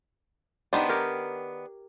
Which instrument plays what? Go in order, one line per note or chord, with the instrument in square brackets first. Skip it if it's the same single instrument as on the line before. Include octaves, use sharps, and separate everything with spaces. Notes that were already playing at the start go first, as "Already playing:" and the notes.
[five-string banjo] D#3 B3 D4 [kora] G4 C5
[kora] G4 A#4 C#5